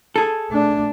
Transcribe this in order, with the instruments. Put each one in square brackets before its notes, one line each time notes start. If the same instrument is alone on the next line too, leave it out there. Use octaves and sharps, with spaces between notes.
[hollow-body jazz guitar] G#4 A4
[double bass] A3 D4